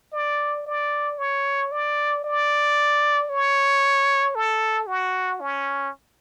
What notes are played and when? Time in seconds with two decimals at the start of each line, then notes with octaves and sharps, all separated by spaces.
0.13 D5
0.66 D5
1.18 C#5
1.72 D5
2.25 D5
3.30 C#5
4.35 A4
4.87 F#4
5.41 C#4